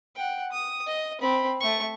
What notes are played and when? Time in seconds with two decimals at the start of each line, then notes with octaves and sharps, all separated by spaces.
0.15 F#5 G5
0.52 D#6
0.86 D#5
1.21 C4 B5
1.60 A3 C#6